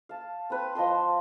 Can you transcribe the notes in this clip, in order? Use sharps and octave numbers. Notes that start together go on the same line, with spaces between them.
F5 A5
C4 B4
F3 D#5 A5 C6